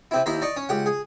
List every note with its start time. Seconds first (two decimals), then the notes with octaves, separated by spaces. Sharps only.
0.11 C3 C4 E4
0.26 D#2 E4 C5 E5 A#5
0.42 D5 D#5 A#5 C#6
0.56 C#4
0.69 C#2 G4 F#5
0.86 G#4